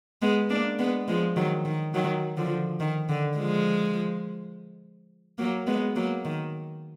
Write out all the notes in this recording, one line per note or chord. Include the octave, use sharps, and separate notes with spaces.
G#3 B3
A#3 D4
G#3 B3
F3 G#3
D#3 F#3
D#3
D#3 F#3
D3 F3
D#3
D3
F3 G#3
F#3 A#3
G#3 B3
F#3 A#3
D#3